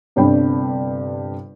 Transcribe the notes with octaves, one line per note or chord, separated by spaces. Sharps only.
G1 G2 C3 D4 G5 B5